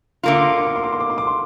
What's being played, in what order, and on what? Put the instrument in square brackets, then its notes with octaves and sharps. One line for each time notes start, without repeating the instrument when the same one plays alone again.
[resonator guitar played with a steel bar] D3 A#3 F4 [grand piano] C6
[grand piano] D6
C6
D6
C6
D6
C6
D6
C6
D6
C6
D6
C6